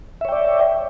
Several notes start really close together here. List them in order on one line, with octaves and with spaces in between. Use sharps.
E5 C#5 G5 D5